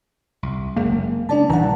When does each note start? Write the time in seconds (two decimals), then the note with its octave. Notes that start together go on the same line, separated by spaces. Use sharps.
0.43 C2
0.76 F#1 G#3 A#3
1.29 C#3 D4 D5 A5
1.50 A#1 E3 G3 F#5 A5 A#5